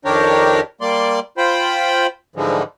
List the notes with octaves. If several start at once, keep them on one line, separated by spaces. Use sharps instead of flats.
F2 D#3 D4 G4 A#4 C#5
G3 A#3 D5 C6
F4 C5 G5 B5
G#2 D3 E3 F3 G3 G#3